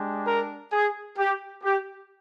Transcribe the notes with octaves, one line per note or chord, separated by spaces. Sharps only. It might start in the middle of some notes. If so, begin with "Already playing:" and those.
Already playing: G#3 D4 G4
A#4
G#4
G4
G4